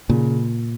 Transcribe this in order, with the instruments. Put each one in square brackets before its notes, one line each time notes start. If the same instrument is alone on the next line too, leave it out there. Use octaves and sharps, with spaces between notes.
[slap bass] A#2 [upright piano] C#3